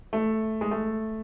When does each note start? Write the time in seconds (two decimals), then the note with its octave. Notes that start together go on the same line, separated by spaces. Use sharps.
0.13 A3
0.61 G#3
0.71 A3